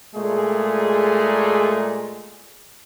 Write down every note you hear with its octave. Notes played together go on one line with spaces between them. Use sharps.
A#2 G#3 A3 G#4